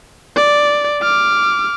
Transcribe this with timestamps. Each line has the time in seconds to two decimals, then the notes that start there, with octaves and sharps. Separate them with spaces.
0.36 D5
1.02 D6 F6